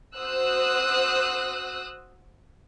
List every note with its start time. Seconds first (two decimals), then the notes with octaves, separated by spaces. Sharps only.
0.17 F#4 C5 D#6 E6 F#6